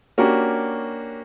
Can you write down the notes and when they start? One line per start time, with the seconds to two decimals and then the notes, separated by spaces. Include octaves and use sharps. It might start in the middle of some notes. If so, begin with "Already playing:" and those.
0.18 A#3 C#4 D4 F#4 G4